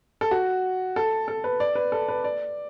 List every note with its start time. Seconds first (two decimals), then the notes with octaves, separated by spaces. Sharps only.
0.21 A4
0.31 F#4
0.96 A4
1.28 A4
1.44 B4
1.60 D5
1.75 B4
1.92 A4
2.08 B4
2.24 D5